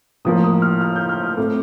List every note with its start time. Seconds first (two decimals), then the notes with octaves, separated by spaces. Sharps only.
0.25 A2 F3 A#3 D#6
0.44 D#6
0.62 F6
0.81 F6
0.96 G6
1.09 F6
1.23 D#6
1.37 A2 A3 C4 D6